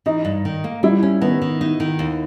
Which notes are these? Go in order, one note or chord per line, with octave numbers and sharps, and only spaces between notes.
E3 D#4
G2
D#3
A#3
G3 E4
C#4
D#3 B3
D#3
D#4
D#3
D#2